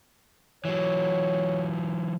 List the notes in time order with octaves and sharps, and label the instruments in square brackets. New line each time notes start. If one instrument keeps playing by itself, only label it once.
[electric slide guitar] E3 F#3 [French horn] C#5